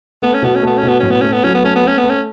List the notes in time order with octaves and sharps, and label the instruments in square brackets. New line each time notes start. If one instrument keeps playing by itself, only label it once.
[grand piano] A3 [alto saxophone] B3
[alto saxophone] C#4
[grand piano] B2 [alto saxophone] B3
[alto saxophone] C#4
[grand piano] A3 [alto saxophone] B3
[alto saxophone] C#4
[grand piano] B2 [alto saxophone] B3
[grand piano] A2 [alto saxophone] C#4
[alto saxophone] B3
[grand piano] A3 [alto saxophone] C#4
[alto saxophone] B3
[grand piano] F#3 [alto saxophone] C#4
[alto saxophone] B3
[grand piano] A3 [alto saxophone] C#4
[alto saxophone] B3
[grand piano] A3 [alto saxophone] C#4
[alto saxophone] B3
[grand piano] A3
[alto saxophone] C#4